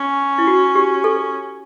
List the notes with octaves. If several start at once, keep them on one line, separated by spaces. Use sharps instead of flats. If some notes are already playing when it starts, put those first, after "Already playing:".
Already playing: C#4
E4
F#4
G4
A4